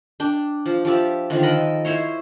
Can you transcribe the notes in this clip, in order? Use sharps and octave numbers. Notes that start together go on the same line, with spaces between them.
D4 G5
F3
F3 G4 D5 E5
D3 D#3 F3
A4 A#4 D#5 B5
E4 C5 C#5